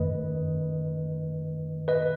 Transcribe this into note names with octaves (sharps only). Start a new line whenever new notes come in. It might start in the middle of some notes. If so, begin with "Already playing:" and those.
Already playing: F#2 D#3 A3 B4 D#5
B4 D#5